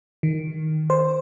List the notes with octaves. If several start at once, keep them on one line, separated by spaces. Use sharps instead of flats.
D#3
C5